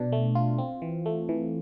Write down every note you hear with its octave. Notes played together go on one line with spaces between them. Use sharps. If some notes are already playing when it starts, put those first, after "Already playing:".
Already playing: B2 D4
A3
F4
C4
E3
A3
E3